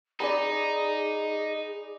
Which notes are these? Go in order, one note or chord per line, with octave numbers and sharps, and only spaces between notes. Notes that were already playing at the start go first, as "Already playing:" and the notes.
D#4 G#4 D5 G#5 B5